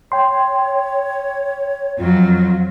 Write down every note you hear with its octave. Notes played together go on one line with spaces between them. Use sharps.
C#5 G5 C6
F2 F#3 F4